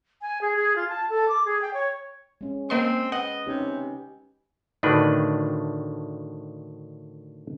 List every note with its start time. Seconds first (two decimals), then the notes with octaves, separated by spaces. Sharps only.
0.22 G#5
0.41 G#4
0.56 G#4
0.76 F4
0.89 A5
1.10 A4
1.28 D6
1.45 G#4
1.62 G5
1.74 C#5
2.41 G#3 C#4
2.70 A#3 C4 D#5 C6
3.12 B4 D#5 F#5
3.47 C3 C#4 D#4 G4
4.83 D2 A2 D#3 D4 B4